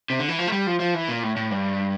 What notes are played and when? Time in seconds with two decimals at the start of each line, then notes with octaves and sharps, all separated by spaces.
0.10 C3
0.19 D3
0.29 E3
0.39 F3
0.47 A3
0.52 G3
0.67 F3
0.80 F3
0.94 E3
1.09 A#2
1.23 A2
1.36 A2
1.51 G2